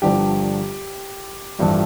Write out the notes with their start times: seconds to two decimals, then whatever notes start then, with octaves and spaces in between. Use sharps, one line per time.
0.02 G1 G2 D3 F3 G4
1.59 A1 G2 F3 A3